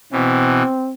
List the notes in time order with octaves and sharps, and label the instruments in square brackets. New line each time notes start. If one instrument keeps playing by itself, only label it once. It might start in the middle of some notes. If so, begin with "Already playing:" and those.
[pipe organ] B2 E3 [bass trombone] C4